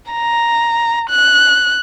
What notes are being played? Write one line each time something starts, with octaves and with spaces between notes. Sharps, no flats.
A#5
F#6